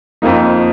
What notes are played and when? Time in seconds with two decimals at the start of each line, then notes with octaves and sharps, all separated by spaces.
0.22 F2 F3 A#3 D#4